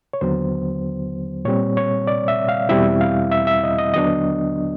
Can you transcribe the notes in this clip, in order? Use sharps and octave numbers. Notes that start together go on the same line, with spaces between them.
C#5
D#2 D3 F#3 B3 C5
A#2 G3 C4 C#5
C#5
D5
E5
F5
E2 B2 G3 C4 E4 E5
F5
E5
E5
D#5
D#5
D#2 D3 F#3 B3 D4 D#5